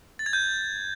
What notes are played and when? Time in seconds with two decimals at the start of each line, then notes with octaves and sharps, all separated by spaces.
0.19 A6
0.26 G#6
0.33 G6